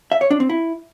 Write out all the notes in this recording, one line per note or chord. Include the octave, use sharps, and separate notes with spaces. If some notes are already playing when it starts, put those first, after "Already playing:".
E5
C#5
D4
C4
E4